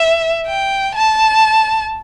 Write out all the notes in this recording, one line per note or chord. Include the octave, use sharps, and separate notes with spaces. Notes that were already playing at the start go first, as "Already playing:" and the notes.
Already playing: E5
G5
A5